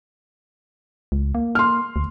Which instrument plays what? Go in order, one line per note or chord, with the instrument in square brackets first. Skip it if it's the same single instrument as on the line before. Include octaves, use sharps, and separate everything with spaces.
[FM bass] C#2
A#3
[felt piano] C6 F6
[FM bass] D2